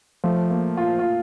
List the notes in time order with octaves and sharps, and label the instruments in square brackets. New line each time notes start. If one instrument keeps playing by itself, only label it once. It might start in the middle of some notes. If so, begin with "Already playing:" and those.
[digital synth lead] F3 [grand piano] A3
[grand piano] A#3
F4
F4